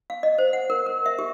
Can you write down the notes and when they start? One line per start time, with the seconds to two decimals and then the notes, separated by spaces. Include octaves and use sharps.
0.10 F5
0.23 D#5
0.38 C5
0.53 F#5
0.70 A#4
0.86 A#4
1.06 E5
1.19 G4